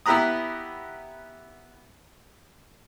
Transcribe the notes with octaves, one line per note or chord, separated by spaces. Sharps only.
B3 E4 G4 B4 A#5 D#6